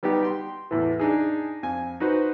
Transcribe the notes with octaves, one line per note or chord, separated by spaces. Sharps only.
G3 B3 D#4 G4
G5 C6
E2 A2 E3
D4 D#4 G#4
F2 G#5
D#4 F#4 B4 C5